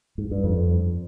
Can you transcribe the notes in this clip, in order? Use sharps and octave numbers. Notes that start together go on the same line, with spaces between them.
G#2
G2
F2